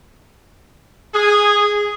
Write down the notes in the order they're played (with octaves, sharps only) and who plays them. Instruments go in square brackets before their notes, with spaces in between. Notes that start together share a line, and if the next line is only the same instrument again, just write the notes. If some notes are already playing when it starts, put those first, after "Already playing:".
[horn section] G#4